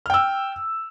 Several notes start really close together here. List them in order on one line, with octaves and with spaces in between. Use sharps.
F6 G5 E6